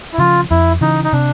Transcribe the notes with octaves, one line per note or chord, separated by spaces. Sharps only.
E4
C#3 F3 F4
F2 E4
C#3 E3 D#4
D#4
C3 D4